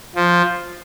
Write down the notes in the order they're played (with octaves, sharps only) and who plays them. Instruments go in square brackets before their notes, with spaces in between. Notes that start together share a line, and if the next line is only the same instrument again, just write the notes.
[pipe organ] F3